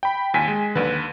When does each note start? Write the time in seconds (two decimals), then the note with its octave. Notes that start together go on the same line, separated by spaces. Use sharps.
0.03 G5 B5
0.34 D#2 G#5 B6
0.48 G#3
0.75 D#2 D3 B4